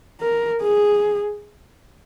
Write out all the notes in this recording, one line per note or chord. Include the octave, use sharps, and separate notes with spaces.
A#4
G#4